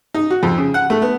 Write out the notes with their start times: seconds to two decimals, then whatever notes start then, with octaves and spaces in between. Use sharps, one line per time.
0.14 D#4
0.30 F#4
0.43 F2
0.58 C#3
0.74 F#5
0.90 A3
1.02 B3